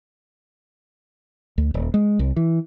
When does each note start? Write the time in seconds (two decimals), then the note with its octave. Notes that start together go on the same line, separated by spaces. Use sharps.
1.58 D2
1.74 D#1
1.94 G#3
2.19 C2
2.36 E3